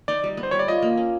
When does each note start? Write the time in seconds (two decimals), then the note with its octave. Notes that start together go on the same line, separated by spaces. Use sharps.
0.08 D#4 D5
0.24 G3
0.37 B3
0.43 C5
0.51 G3 C#5
0.59 D5
0.68 F4 D#5
0.82 A#3
0.97 C#4